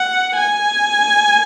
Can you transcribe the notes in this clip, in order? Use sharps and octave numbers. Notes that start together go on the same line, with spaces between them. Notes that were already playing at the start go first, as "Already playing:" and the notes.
Already playing: F#5
G#5